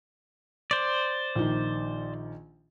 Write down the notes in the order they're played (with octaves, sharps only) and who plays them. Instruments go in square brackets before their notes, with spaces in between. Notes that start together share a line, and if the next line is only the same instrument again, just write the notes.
[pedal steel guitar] C5 D5
[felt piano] A#1 D#3